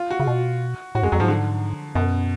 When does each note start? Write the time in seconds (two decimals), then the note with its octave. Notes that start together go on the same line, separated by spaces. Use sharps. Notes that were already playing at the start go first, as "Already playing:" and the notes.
Already playing: F4
0.11 F#4
0.20 C#3
0.27 B2
0.95 A2 F#4
1.03 F#2 G#3
1.12 F2 F#3
1.20 G#2 F3
1.28 D3
1.95 F#2 B2